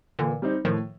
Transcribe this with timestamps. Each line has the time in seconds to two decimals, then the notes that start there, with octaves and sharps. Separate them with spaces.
0.19 A#2 D3 E3
0.42 G3 C4 D#4
0.65 A2 D#3 F3